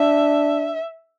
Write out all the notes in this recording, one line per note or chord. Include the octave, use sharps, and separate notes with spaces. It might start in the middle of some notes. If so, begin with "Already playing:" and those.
Already playing: D4 E5